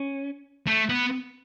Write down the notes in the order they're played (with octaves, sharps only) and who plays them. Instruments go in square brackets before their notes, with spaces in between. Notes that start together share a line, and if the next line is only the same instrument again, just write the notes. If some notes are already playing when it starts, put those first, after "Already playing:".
Already playing: [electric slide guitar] C#4
[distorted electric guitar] A3
B3